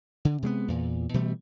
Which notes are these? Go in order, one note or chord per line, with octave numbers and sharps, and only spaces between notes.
D3
C3 G#3 A#3 B3
E2 A#2
B2 E3 G3 A3